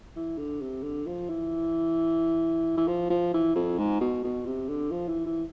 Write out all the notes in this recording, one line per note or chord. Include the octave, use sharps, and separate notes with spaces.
E3
D3
C3
D3
F3
E3
E3
F3
F3
E3
F2
G#2
B2
B2
C3
D3
F3
E3
E3